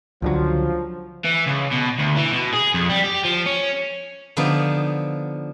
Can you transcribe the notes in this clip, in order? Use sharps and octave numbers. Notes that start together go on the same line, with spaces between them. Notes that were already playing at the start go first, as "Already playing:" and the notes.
C#2 D3 F3 F#3
E3
C#2
B2
D2
E3
B2
G#4
F2
G3
G4
F3
C#4
D3 F3 B3 D4 D#4